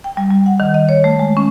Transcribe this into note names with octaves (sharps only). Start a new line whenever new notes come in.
G5
G3
G3
F#5
D#3
D#5
C#5
A3
G#3
C#4